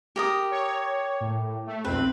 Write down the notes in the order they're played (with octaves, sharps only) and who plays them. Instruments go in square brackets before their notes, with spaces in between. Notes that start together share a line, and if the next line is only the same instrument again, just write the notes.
[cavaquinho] G4 A#4 D#6
[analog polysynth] C#5
A2
A3
[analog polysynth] B1 F2 C4 [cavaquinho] B4